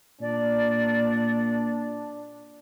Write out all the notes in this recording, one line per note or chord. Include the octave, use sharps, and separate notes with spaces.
A#2 D4 D5